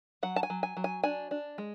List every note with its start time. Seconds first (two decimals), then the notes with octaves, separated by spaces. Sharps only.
0.23 F#3 F#5
0.36 A5
0.43 G#5
0.50 F#3
0.63 G#5
0.77 F#3
0.84 G#5
1.04 D4 G#5
1.31 D4
1.58 G#3